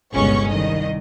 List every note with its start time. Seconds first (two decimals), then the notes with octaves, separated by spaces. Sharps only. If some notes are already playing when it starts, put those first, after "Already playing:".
0.13 G1 C#2 B2 G#3 C#4 C#6
0.47 C2 D#3 D#5